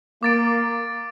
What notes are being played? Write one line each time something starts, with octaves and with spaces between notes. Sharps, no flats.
A#3 D6 A6 D7